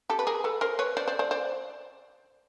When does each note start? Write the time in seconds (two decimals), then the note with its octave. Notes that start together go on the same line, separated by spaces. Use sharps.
0.10 G4 A4
0.19 B4
0.27 G#4 A#4
0.44 A4 B4
0.61 A#4 C5
0.79 B4 C#5
0.97 C5 D5
1.08 C5 D5
1.19 C5 D5
1.31 C5 D5